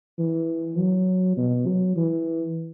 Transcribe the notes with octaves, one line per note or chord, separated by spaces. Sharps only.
E3
F#3
B2
F#3
E3